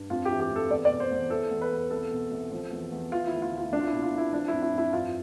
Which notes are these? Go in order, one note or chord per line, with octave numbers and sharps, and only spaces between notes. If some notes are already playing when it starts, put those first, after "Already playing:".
Already playing: G2
F2 F4
G4
E3
G4
F2 A4
E2 D5
D5
B2
C5
E2
E3 A4
E2
B4
E2
C2 A4
B2
C2
F3
E2
E2
E3 F4
D2 E4
F4
D2
F4
C2 D4
F4
B2 E4
F4
C2
E4
F3 D4
F2 E4
E4
F2 E4
G2 F4